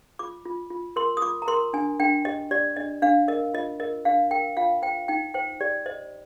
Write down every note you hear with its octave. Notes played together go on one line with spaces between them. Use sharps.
F4 D6
F4
F4
A#4 C6
D#6
F4 D6
A#5
A#4 C6
D4 G#5
D4 G5
G4 D#5
G4 D5
D4 D#5
D4 F5
A#4 D#5
F4 D#5
A#4 D#5
D4 F5
A#4 G5
F4 F5
C5 G5
D#4 G5
C5 G5
G4 D5
C5 D#5